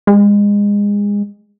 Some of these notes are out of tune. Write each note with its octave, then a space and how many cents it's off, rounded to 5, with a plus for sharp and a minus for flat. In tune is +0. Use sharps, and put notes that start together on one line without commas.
G#3 -25